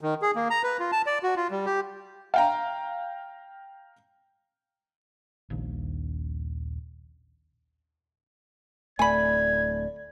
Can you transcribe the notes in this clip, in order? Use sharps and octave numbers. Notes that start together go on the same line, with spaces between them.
D#3
G#4
A#3
A#5
B4
F4
A5
D5
F#4
F4
G3
G4
F5 G5 A#5
D#1 A#1 D#2
D1 A3 D5 G#5 B5 G#6